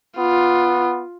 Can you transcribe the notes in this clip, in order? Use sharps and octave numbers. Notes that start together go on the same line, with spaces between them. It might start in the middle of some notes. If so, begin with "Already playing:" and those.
B3 F4